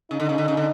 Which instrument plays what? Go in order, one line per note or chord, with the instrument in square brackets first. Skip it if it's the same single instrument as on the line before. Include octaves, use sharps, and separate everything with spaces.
[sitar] C#3 [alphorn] D#4
[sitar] D3
C#3
D3
C#3
D3